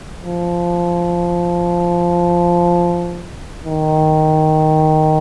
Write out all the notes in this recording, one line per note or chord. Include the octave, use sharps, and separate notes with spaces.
F3
D#3